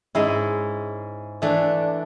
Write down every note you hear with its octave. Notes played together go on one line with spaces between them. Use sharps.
G#2 G#3 C#4 E4
E3 A3 D4